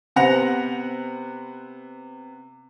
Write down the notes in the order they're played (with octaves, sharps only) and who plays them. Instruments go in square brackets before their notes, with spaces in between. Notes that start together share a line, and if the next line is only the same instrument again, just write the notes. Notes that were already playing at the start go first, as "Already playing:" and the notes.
[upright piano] C3 B3 C5 F#5 A#6 F7